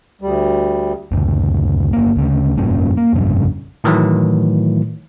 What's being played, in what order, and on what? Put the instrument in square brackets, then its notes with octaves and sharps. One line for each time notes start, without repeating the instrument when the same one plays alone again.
[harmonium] D2 G3
[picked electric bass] F#1 D2
G1 A#3
D2 C#3
F1 G2 A#2 C#4
A#3
F1 A#1 G2 C#3
[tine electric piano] A2 D#3 E3 F#3 A3